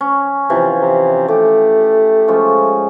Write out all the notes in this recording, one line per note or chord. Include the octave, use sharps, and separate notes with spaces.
C#4
C3 E3 F3
C3
A3 G4
F3 G#3 C#4